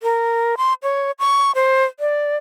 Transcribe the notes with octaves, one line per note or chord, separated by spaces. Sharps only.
A#4
C6
C#5
C#6
C5
D5